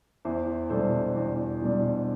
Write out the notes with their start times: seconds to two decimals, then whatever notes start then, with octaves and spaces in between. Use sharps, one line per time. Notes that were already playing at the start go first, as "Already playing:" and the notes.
0.25 E2 C5 E5
0.70 B2 G3 D4 A4 C5
1.16 E2
1.62 B2 G3 D4